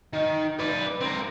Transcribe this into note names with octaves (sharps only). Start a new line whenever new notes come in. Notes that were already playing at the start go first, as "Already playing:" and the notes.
D#3
B4 D5
C4 A#4